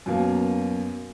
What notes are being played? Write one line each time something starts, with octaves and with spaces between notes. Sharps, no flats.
F#2 B2 A#3